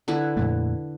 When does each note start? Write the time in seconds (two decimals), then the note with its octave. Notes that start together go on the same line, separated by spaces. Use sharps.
0.08 D3 E4 B4
0.37 F2 A#2 A3